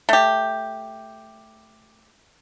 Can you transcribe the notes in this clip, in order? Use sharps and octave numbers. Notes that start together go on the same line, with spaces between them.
A3 G4